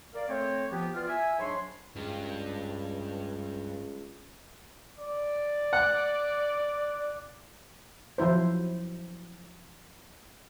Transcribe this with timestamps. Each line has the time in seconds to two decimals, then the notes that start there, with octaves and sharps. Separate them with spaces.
0.14 A#4 D5 F5
0.29 A3 C4 C#5
0.71 F3 B3 G4
0.93 E3 B3 F4 D5 F6
1.08 E5 G#5
1.39 G#2 F#3 D4 C#5 B5 C6
1.96 C#2 G2
4.99 D5
5.73 F#5
8.18 F3 F#3 E4 C5